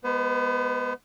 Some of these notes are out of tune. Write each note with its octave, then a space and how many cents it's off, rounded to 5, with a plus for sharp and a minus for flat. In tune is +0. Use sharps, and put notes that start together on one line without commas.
G#3 +0 B3 -15 B4 +45